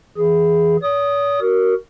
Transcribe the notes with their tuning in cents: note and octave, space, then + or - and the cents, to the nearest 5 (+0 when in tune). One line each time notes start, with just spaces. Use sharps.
E3 +0 G#4 +0
C#5 +45 D#6 +0
F#4 +20 A#4 +0